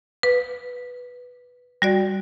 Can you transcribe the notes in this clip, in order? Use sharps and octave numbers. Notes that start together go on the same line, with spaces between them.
B4
G3 F#4 D5